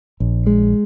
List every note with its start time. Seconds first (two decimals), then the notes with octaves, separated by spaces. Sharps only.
0.20 A#1
0.47 G#3